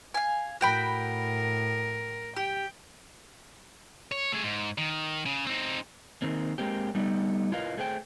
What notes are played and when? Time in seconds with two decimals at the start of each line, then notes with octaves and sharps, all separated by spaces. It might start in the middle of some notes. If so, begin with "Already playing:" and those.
0.14 F5 G#5
0.61 A2 F#4 A#4 G5 B5
2.36 G4 G5
4.12 C#5
4.32 A3 G#4
4.44 G#2
4.78 D#3
5.26 C#3
5.47 C4 D#4
6.22 D#3 A#3 C4
6.58 G#3 A#3 C4 G4
6.95 G3 A3 B3 D#4
7.52 E4 F4 A#4 B4 D#5 F5
7.77 A3 G#4 C5 F#5 G5